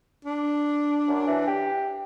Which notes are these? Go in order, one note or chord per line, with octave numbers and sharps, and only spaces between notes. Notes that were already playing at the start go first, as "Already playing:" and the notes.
D4
F#2
E3
G4